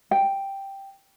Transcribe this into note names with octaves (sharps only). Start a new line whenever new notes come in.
G5